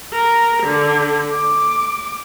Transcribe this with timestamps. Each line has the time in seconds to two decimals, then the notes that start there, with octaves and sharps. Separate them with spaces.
0.12 A#4
0.63 D3
1.31 D6